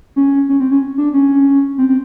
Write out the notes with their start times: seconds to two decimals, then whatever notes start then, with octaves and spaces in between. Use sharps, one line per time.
0.16 C#4
0.49 C#4
0.60 C4
0.71 C#4
0.98 D4
1.14 C#4
1.78 C4
1.89 C4